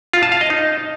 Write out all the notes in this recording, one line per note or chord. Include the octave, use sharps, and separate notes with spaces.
F4
A5
F5
D#5
D#4